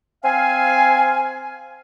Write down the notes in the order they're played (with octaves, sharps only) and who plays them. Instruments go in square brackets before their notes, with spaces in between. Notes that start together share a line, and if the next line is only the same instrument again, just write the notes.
[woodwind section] C4 F5 G#5